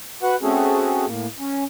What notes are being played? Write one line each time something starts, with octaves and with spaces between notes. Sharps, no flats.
F#4 B4 F#5
A3 C4 C#4 F#4 G#4 A4
A2 A#3
C#4